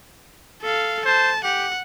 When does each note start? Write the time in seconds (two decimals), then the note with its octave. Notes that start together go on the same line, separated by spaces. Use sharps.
0.62 A4 F5
1.05 C5 A5
1.44 G4 F#5